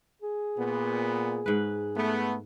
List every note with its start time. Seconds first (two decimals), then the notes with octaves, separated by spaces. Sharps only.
0.22 G#4
0.58 A#2 B3
1.46 G#2 B4
1.95 A3 B3